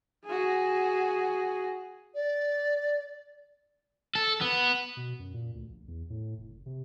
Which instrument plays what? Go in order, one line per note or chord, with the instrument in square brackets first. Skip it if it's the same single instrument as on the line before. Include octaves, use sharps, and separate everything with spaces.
[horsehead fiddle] F#4 G#4
[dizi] D5
[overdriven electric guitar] A4
B3
[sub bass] B2
F#2
A#2
D2
A#1
E2
A2
F1
F#1
C3